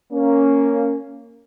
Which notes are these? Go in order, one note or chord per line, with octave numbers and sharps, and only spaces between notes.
A#3 C#4